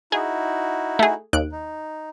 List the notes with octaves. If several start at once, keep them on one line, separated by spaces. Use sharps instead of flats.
D#4 E4 F#4 G#4
A3 G#4
D#2 F#6 D7
D#4